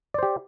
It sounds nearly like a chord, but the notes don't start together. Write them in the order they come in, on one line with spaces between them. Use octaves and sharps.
D5 C5 G4